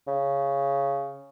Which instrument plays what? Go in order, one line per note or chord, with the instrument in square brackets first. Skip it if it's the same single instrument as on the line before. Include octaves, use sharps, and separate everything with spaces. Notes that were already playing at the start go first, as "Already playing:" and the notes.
[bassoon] C#3